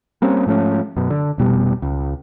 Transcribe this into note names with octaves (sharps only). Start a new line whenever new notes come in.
G3 A#3 C4 C#4
G#2 F3 A3 C#4
F#2 B2
D3
F1 B2 G3
C#2